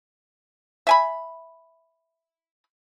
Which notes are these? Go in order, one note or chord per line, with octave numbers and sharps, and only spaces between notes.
E5 G#5 B5